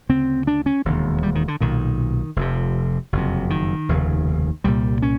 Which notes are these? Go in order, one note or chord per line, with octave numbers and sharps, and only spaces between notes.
D2 C#3 C4
D4
C#4
E1 D#2 D3
G3
D#3
D3
B1 A#2 D#3
F1 F2 C3
F#1 F2 C3
D#3
F1 D#2 C#3
C2 A#2 G3
C#4